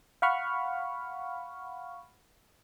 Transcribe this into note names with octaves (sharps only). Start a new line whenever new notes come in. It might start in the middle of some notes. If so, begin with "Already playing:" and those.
F5 F#5 B5 C#6 F6